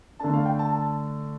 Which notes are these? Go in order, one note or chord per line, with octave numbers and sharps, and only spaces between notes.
D3 A3 D4 A5
F5
G5
A5
A5